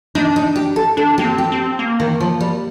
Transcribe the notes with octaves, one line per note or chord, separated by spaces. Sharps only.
D4 D#4
D#4
G4
A4
D4 A4
A#3 G4
C4
G4
C4
A#3
D#3
F3
G3